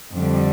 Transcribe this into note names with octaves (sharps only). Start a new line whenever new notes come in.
F2 D3 G3